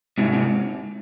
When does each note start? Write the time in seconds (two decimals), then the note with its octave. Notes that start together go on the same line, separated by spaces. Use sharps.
0.18 G#2 C3
0.33 C3